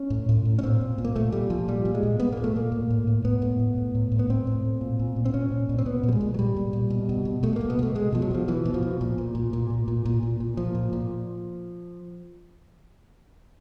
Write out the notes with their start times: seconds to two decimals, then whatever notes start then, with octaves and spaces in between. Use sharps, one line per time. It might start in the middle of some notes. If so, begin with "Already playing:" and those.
Already playing: C#4
0.10 A2
0.29 A2
0.45 A2
0.59 C#4
0.63 A#2 C4
0.81 A#2
0.98 A#2
1.05 A#3
1.16 A#2 A3
1.32 A#2 G3
1.50 A#2 F3
1.68 A#2 G3
1.85 A#2
1.95 G#3
2.03 A#2
2.20 A#2 B3
2.32 A#2 A#3
2.44 A3
2.56 A#2 A#3
2.72 A2
2.90 A2
3.07 A2
3.25 A2 B3
3.42 A2
3.59 A2
3.78 A2
3.95 A2
4.12 A2
4.19 B3
4.29 A2 C4
4.47 A2
4.64 A2
4.81 A#2
4.99 A#2
5.16 A#2
5.25 C4
5.34 A#2 C#4
5.51 A#2
5.69 A#2
5.78 C4
5.86 A#2 B3
6.03 A#2
6.08 G3
6.12 G#3
6.21 A#2
6.34 F#3
6.39 A#2 G3
6.56 A#2
6.73 A#2
6.90 B2
7.09 B2
7.25 B2
7.43 B2 A3
7.56 B2 A#3
7.70 B3
7.79 B2 A3
7.95 B2 G#3
8.12 B2 F3
8.22 F#3
8.31 B2 F3
8.48 B2 E3
8.65 B2
8.74 F3
8.83 B2
9.01 A#2
9.18 A#2
9.35 A#2
9.53 A#2
9.70 A#2
9.88 A#2
10.05 A#2
10.23 A#2
10.40 A#2
10.57 A#2 F3
10.75 A#2
10.93 A#2